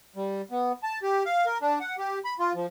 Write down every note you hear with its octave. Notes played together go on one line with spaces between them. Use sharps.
G3
B3
A5
G4
F5
A#4
D4
F#5
G4
B5
F4
F3